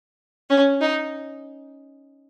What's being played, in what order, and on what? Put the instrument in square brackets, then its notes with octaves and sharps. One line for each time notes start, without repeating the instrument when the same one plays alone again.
[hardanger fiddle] C#4
D#4